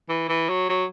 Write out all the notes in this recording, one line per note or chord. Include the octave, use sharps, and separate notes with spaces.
E3
E3
F#3
F#3